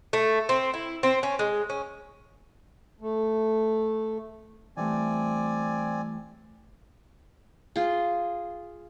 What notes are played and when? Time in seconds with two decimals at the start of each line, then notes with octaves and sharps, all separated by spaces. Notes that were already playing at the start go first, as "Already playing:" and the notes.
0.13 A3
0.49 C4
0.74 E4
1.03 C4
1.23 C#4
1.39 G#3
1.70 C#4
3.01 A3
4.77 E3 G3 A3 C4 D5 G#5
7.76 F4 G#4